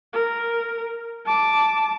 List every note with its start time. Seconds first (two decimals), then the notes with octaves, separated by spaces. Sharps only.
0.13 A#4
1.25 A5 D6